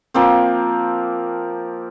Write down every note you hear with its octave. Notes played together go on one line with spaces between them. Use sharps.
F3 A#3 C4